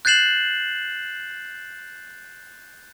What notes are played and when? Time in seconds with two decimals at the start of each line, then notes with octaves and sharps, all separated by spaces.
0.05 F#6 G6 A6 C7 E7 F#7